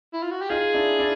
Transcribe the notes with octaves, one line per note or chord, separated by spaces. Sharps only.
E4
F4
F#4
G4
D#4 F4 G#4
D4 E4
D4 E4